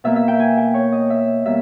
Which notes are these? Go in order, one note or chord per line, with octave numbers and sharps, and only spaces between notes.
B2 A#3 E5
E5
G5
G#5
G5
C#5
D#5
E5
B2 G3 A#3 E5